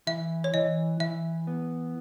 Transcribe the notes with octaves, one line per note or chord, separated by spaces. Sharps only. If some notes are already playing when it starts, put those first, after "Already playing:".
E3 E5
C#5
E3 D#5
E3 E5
B3